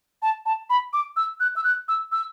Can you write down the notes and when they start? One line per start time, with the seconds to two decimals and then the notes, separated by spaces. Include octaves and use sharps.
0.22 A5
0.46 A5
0.70 B5
0.93 D6
1.17 E6
1.40 F#6
1.56 E6
1.64 F#6
1.88 E6
2.12 E6